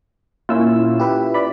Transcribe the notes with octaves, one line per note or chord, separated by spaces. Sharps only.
A#2 C#4 E4 F4 E6
G4 B4 E5
D5 B5